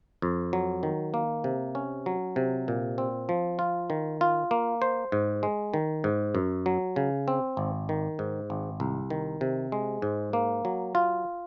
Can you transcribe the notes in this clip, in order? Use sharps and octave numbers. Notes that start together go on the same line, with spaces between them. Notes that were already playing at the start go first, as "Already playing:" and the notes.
F2
F#3
D#3
A#3
C3
C#4
F#3
C3
A#2
C4
F3
F4
D#3
F4
A#3
C5
G#2
G#3
D#3
G#2
F#2
F#3
C#3
C4
G#1
D#3
G#2
G#1
C2
D#3
C3
G#3
G#2
A#3
F#3
F4